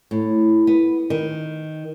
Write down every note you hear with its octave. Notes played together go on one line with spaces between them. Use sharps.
A2
B3
D#3